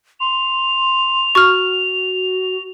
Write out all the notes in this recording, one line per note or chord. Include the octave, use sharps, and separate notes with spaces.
C6 F7
F#4 C#6 F6